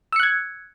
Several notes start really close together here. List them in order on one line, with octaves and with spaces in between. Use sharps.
E6 C#7 F#6 G#6